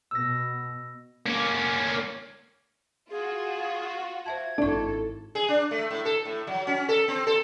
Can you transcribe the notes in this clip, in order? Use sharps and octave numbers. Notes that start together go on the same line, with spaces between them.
B2 E6 A#6
A#3 C#4
F4 F#4 G#4
C5 E5 A5 G#6
G#1 D4 E4 A4 C#6
G#4
D4
A3
A2
A4
A2
F#3
C#4
A4
C4
A4